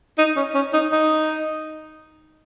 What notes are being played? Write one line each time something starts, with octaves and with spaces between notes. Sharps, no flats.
D#4
C#4
C#4
D#4
D#4